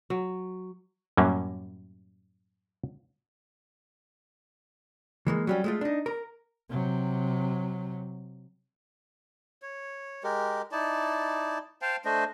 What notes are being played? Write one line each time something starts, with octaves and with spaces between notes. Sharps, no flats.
F#3
F#2 A2 F#3 G3 A#3 C#4
E3 G#3 A#3
F#3 G3 C#4
G#3 A3 F4
D4 D#4
A#4
C3 F#3
C#5
G#3 G4 A#4
D#4 E4 D5 A5
C5 F5 G5 A5
A3 D4 C5 D#5